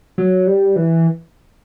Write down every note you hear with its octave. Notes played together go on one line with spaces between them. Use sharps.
F#3
G3
E3